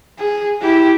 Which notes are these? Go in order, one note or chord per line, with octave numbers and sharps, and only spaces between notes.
G#4
E4 G4